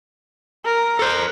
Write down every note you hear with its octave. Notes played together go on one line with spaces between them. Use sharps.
A#4
A4 C5